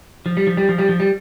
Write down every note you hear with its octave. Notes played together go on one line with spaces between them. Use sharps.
F3
G3
F3
G3
F3
G3
F3
G3